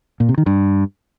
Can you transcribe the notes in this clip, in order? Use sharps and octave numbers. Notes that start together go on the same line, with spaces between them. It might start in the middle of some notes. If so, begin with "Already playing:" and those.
A#2
C3
D#3
G2